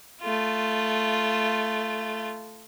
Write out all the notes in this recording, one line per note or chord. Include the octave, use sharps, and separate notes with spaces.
A3 F4